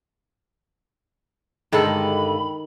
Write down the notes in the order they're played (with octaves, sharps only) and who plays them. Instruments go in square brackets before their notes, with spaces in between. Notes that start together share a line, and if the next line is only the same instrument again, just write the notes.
[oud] G2 D3 G#3 [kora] D#3 A4 [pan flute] B5